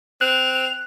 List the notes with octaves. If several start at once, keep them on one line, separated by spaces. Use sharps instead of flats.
C4 F#6 F7